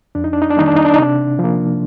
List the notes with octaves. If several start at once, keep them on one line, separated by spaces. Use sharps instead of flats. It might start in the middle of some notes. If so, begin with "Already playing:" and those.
F2 D4
D#4
D4
D#4
D4
D#3 G3 A#3 D#4
D4
D#4
D4
D#4
C3 D4
F3 A#3